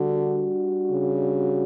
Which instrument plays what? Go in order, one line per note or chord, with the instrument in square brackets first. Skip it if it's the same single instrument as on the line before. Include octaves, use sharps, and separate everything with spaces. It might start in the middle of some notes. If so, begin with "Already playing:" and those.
Already playing: [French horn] D3 [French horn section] G3 D4 F#4
[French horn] C#3